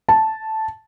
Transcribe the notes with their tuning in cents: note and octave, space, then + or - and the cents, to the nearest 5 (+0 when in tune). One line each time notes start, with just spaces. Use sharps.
A5 -5